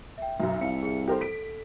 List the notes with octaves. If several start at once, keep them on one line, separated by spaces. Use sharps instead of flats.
E5 G5
B1 F#2 E5
C2 E5 F5 C#7
G#4 C#7
G4 A4 A#4 C5
B6 D7